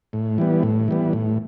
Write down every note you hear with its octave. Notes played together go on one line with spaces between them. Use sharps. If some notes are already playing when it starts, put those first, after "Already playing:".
A2
E3 G3 B3
A2
E3 G3 B3
A2